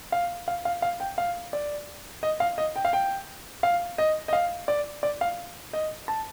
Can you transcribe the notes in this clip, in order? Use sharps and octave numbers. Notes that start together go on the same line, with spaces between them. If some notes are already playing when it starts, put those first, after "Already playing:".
F5
F5
F5
F5
G5
F5
D5
D#5
F5
D#5
G5
F5
G5
F5
D#5
D#5
F5
D5
D5
F5
D#5
A5